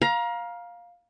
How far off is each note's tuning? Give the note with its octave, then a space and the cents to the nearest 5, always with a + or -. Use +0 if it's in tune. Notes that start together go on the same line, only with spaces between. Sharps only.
F5 +10 A#5 +30